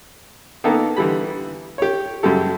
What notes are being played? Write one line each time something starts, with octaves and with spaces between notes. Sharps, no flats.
D#3 A#3 B3 A4
D3 E3 G3 B5
G4 C#5
F#2 C#3 G3 G4 A4